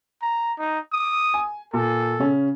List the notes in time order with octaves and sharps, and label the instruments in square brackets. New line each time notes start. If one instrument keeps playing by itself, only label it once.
[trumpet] A#5
D#4
D#6
[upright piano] G#5
[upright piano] A#2 [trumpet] A4
[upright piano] C#3 C#4